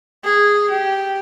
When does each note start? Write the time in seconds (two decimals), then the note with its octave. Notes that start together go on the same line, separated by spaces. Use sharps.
0.24 G#4
0.70 G4